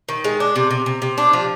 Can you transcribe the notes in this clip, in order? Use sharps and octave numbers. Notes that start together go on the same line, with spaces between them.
D#3
G#3
D4
C3
C3
C3
C3
D4
F3